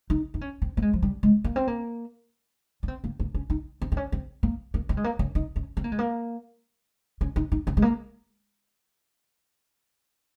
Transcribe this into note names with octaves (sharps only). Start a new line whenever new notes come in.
D#4
D#4
C#4
C4
A#3
G#3
F3
G3
G#3
A#3
C4
A#3
C#4
C4
A#3
A#3
C#4
D#4
C4
C4
C#4
C4
A#3
A#3
C4
G#3
A#3
C#4
D#4
C#4
C4
A#3
G#3
A#3
C#4
D#4
D#4
C#4
G#3
A#3